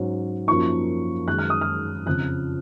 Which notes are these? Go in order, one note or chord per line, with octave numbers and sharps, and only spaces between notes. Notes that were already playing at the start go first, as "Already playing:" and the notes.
Already playing: G#2 F#3 C#4
F#2 F3 A#3 D#4 C#6
F#2 D#3 G#3 F#6
F6
D#6
F6
F2 C#3 F3 F#6